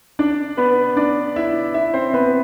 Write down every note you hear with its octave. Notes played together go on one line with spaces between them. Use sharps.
D4 D5
B3 B4
D4 D5
E4 E5
E4 E5
C4 C5
B3 B4